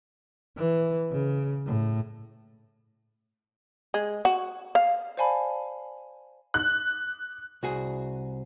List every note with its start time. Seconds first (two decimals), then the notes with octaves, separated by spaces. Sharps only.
0.57 E3
1.12 C#3
1.66 A2
3.94 G#3
4.25 F#4
4.75 F5
5.17 C5 D5 F5 G#5 A5 B5
6.54 F#6
7.63 C2 F#4 G#4